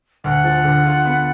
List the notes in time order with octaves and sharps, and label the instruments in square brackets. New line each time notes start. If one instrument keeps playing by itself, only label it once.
[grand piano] D2 [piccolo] F#5
[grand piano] F3
D3
F4
B3